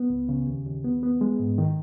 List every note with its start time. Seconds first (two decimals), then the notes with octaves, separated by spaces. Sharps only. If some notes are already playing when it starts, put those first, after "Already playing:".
Already playing: B3
0.10 C#2
0.29 C#3
0.47 D#2
0.66 D#2
0.84 B3
1.03 B3
1.21 G#3
1.40 G#2
1.58 D#3